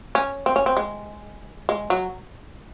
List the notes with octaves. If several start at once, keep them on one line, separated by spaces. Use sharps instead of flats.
C#4
C4
C#4
C4
G#3
G#3
F#3